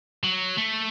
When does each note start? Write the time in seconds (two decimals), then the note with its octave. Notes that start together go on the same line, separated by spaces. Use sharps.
0.24 F#3
0.57 A3